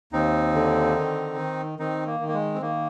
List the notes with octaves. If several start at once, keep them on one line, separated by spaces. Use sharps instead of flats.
D#2 C4 D#4
D3
D#3
D#3
D#3 C4 D#4
A#3
D#3
A#3
G#3
C4
D#3 A#3